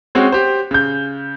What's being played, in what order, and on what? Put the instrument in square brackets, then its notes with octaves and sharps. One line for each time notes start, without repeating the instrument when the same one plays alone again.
[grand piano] G#3 C4 C#4 F#4
G4 C5
C#3 G6